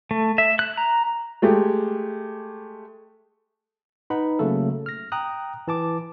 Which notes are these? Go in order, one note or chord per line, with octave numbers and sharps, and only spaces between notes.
A3
E5
F#6
A#5
G#3 A3 G4 D6
D#4 B4 F#5 B5
C#3 F#3 A3 A#3 A4
F6 A#6
G5 A#5 D#6 F#6
E3 A5 D6